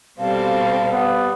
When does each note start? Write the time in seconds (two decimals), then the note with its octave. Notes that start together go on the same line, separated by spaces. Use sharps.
0.18 B2 G3 C4 A4 F5
0.92 B3